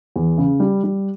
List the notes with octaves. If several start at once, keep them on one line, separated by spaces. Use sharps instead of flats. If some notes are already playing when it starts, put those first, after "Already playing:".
E2
C#3
G3
G3